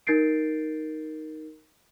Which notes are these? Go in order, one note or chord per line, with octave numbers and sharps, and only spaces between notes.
D#4 A#4 G6 A6 C7 D7